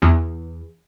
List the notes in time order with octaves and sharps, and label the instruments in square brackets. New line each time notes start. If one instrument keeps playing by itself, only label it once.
[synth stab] E2